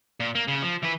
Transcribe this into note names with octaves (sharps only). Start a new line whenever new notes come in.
A#2
A#3
C#3
F3
E3 B4